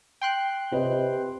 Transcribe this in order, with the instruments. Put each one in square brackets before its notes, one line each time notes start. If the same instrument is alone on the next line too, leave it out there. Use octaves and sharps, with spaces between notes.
[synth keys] G5 C6 F#6
[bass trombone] C3 [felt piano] B4 D#5